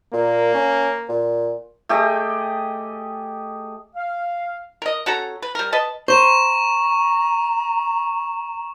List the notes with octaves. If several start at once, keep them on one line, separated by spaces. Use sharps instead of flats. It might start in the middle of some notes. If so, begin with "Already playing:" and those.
A#2 A#3
C#4
A#2
A3 G4 G#4 D#5
F5
A#4 D#5
C#4 F#4 A4 A#5
B4
G3 A#4
B4 D#5 A5
C5 A#5 C#6 E7